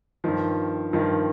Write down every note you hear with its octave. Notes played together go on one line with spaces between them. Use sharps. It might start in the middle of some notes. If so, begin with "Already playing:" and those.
G2 D#3 F3
G2 D#3 F3